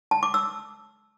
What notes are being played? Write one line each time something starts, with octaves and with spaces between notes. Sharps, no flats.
A5
D6
E6